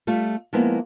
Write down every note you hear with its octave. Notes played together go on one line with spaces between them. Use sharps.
G3 A3 F4
F3 G#3 A#3 B3 E4